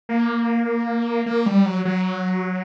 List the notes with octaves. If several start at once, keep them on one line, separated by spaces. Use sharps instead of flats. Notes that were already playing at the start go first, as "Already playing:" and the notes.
A#3
A#3
G3
F#3
F#3